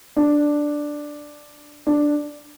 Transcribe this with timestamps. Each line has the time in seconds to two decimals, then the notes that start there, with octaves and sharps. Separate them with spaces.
0.17 D4
1.87 D4